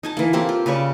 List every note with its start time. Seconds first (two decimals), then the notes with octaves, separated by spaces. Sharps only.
0.03 D#4 G#5 A5
0.17 E3 A#3
0.33 A#3 C4 G4 A4
0.49 F4
0.66 C#3 B4 D5 C#6